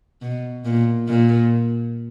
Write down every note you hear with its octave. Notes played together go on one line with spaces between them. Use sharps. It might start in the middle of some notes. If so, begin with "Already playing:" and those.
B2
A#2
A#2